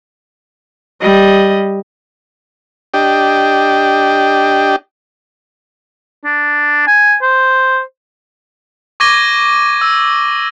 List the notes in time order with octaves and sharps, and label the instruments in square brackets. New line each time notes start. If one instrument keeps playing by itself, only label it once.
[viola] G3 D#5
[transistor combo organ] D4 G4 D#5 G5
[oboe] D4
G#5
C5
[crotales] C#6 D6 G#6 A#6 D#7 G7
E6